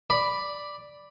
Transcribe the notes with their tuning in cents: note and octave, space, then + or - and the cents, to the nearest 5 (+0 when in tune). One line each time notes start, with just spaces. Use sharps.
D5 +0 B5 +0